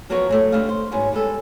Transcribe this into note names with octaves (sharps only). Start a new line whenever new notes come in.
F3 F#3 B3 F#4 A#4 C#5
F#3 G#3 A3
D3 G3 A3 D#5 F5
C5
G#2 F#3 G#3 B3
G3 G#3 B3 A4